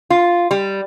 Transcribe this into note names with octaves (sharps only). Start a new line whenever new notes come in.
F4
G3